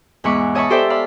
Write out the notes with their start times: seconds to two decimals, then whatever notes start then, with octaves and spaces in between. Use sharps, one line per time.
0.24 E2 G#2 B3 B5 C#6 D6
0.55 C#5 D#5 E5 A5 B5 C#6
0.70 G4 A4 C5 D5 E5 G5
0.90 D5 F5 B5